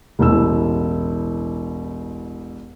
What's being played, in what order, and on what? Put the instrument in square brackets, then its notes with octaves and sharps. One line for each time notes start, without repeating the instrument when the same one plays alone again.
[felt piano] E1 A1 E6